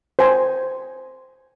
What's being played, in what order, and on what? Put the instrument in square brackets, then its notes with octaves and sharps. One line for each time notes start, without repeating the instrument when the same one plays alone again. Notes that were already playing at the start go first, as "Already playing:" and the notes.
[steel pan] C5 G#5